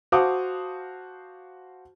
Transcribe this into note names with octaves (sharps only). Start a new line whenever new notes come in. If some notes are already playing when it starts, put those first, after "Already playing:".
F#4 C5 F5 A5 D6 D#6